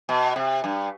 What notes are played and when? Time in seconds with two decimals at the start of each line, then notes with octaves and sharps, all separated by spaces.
0.09 B2
0.36 C3
0.64 G2